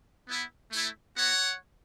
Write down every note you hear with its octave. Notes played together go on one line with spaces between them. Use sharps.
B3 E4
A3 E4
B3 F#4 C#5 F#5